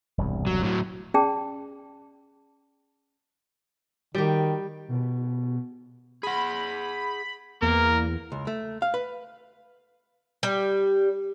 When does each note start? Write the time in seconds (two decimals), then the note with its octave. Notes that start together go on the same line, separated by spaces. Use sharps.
0.18 E1 C2 G2
0.47 F#3
0.63 A2 F#3
1.14 C#4 G#4 D5 G5 A5
4.15 D#3 G3 G4
4.88 B2
6.23 G#4 F#5 B5
7.62 E2 A#3 A#4
8.32 C#2
8.47 A3
8.82 F5
8.94 B4
10.43 G3